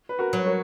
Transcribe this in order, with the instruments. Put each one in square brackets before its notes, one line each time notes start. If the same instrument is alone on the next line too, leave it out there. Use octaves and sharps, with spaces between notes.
[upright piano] B4
F#4 A#4
[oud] F#3
[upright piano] A#4 C#5